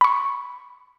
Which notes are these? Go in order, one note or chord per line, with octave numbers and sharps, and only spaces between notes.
B5 C#6